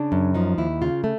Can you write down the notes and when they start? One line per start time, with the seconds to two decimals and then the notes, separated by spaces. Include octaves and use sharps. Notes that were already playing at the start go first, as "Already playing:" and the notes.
Already playing: C#3 D4
0.12 F#2
0.34 F3 D#4
0.58 D#2 E4
0.82 C#3 F4
1.04 A3